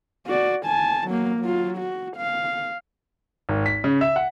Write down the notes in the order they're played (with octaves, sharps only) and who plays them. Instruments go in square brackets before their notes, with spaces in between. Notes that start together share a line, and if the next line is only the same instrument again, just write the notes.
[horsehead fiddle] F#4 D5
G#5 A5
F#3 A#3
F#3 F4
F#4
F5
[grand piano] G#1
B6
C#3
E5
F#5